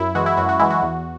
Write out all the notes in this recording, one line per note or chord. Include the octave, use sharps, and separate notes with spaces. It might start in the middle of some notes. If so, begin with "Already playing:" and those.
Already playing: F#2 E4
E3 G#3 F#4
E4
F#2 F#4
F#4
E3 G#3 E4
F#4
E2